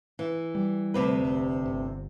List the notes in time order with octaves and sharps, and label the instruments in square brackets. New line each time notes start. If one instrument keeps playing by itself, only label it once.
[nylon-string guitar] E3
[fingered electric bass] G3
[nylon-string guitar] D2 C3 B4
[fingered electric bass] F1
G1